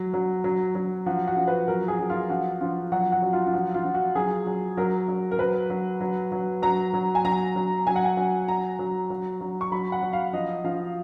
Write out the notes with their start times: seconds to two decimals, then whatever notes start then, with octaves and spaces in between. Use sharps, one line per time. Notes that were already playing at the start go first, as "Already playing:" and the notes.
Already playing: F#3
0.14 F#3
0.44 F#3
0.75 F#3
1.06 F3 F#4
1.27 F#4
1.37 F3
1.47 B4
1.68 F#3 A#4
1.88 G#4
1.99 F#3
2.10 F4
2.30 F3 F#4
2.61 F3 F4
2.92 F#3 F#4
3.12 F#4
3.22 F#3
3.33 F4
3.47 F4
3.53 F3 F#4
3.74 F4
3.84 F3
3.94 F#4
4.15 F#3 G#4
4.46 F#3
4.77 F#3 A#4
5.08 F#3
5.31 A#4
5.39 F#3 B4
5.70 F#3
6.01 F#3
6.32 F#3
6.62 F#3 A#5
6.94 F#3
7.15 G#5
7.25 F#3 A#5
7.56 F#3
7.87 F#3 G#5
7.96 F#5
8.05 G#5
8.17 F#3
8.48 F#3 A#5
8.79 F#3
9.10 F#3
9.41 F#3
9.61 C#6
9.72 F#3 B5
9.92 F#5
10.02 F#3
10.13 F5
10.33 F3 D#5
10.64 F3 F5